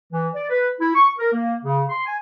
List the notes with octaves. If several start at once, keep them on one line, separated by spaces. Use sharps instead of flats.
E3
D5
B4
E4
C#6
A#4
A#3
C#3
C6
G#5